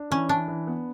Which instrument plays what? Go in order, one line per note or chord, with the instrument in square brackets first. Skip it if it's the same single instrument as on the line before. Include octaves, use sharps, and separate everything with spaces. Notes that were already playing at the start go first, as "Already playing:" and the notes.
Already playing: [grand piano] D4
[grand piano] E3 [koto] C#4
[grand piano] E3 [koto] D4
[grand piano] E3
B3